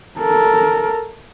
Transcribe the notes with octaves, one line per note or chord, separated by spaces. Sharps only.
A4 A#4